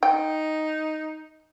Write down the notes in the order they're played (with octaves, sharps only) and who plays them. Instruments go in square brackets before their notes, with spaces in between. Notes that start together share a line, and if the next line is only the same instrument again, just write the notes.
[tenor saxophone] D#4 [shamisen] G5